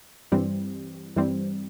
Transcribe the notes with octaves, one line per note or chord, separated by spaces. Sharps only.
G2 E3 G3 C4
G2 E3 G3 C4